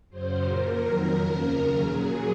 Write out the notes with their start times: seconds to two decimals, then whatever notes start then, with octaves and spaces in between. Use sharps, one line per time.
0.09 F#2 C#3 F#3 C5
0.43 A#2 F3 A#4
0.78 F2 D#3 F#3
1.12 D#2 C#3 F3
1.46 D#2 C#3 F#3 A#4
1.81 A#2 F#3 G#4